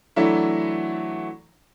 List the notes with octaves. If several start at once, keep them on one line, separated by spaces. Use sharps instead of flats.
E3 F#3 A3 D4 E4